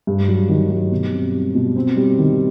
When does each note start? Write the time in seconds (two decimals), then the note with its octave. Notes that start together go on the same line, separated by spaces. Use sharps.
0.07 G2
0.28 F#3
0.49 D#3
0.70 G2
0.92 B2
1.12 C4
1.34 G3
1.55 B2
1.76 C4
1.97 G3
2.19 D#3